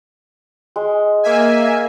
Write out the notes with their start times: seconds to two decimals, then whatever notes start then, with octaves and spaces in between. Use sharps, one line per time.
0.76 G#3
1.23 A#3 E5 G#5